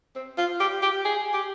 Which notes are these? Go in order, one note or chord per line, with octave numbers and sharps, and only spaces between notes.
C4
F4
G4
G4
G#4
G4